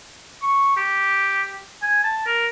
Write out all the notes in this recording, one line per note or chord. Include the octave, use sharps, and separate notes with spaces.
C#6
G4
G#5
A5
A#4